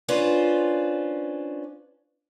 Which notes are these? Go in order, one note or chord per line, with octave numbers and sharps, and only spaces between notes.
C#4 D4 F4 B4 C5